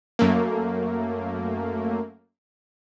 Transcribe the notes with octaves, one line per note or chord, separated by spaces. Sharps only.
F#2 A3 A#3